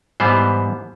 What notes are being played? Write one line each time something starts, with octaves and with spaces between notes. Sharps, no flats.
G#2 E3 G3 B3 C5